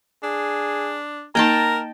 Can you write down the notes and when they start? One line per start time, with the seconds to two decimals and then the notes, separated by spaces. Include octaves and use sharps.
0.24 D4 G#4
1.35 A#3 D#4 A#4 D#5 G5 A5 A#5